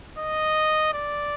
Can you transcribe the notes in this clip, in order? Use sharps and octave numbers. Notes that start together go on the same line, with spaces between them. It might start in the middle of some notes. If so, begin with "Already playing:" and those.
D#5
D5